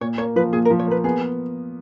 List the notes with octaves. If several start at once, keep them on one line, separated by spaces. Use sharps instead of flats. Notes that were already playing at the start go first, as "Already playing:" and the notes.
A#2 C#5
A#3 C#5
F3 B4
A#2 G#4
A#4
F3
C#5
A#3 B4
B3 G#4